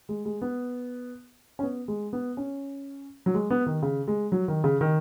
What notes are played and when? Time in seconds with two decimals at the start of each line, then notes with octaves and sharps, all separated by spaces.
0.09 G#3
0.25 G#3
0.42 B3
1.59 C#4
1.63 B3
1.88 G#3
2.13 B3
2.37 C#4
3.26 F#3
3.34 G#3
3.50 B3
3.66 D#3
3.83 C#3
4.08 G#3
4.32 F#3
4.48 D#3
4.64 C#3
4.81 D#3